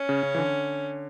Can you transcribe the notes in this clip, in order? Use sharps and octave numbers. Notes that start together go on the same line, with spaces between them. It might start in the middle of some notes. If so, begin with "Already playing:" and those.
Already playing: C#4
C#3
C#3
E3
D3